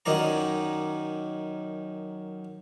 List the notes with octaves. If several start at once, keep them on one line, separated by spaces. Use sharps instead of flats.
F#2 D#3 F#3 D#4 D5 A#5